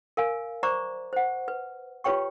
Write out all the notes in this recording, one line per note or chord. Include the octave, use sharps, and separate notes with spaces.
A#4 F5 G#5
C5 D5 A#5 C#6 D6
C5 F#5
B4
F4 G4 B4 C#5 G5 C#6